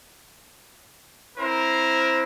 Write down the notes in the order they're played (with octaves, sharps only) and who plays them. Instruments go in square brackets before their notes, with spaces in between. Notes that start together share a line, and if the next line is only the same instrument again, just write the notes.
[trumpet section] C4 E4 A#4 C5